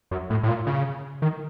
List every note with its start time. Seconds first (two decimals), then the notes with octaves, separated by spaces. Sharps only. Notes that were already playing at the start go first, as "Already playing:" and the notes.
0.11 F#2
0.30 A2
0.43 A2
0.48 A#2
0.67 C#3
1.22 D#3